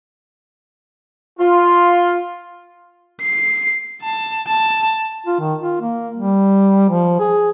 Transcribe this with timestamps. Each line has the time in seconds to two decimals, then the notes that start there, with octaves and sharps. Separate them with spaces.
1.39 F4
3.22 C7
4.02 A5
4.47 A5
5.26 F4
5.40 D#3
5.61 F4
5.81 A#3
6.16 G3
6.89 F3
7.19 G#4